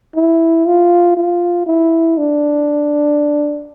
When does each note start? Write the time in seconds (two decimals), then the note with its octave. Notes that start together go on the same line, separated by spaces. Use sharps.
0.15 E4
0.66 F4
1.17 F4
1.66 E4
2.18 D4